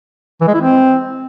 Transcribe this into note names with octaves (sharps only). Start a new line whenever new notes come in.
E3
G#3
E4
C4